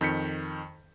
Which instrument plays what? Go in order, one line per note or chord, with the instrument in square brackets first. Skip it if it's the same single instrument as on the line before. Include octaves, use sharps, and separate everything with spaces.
[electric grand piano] F2 D#3 G6 B6 C#7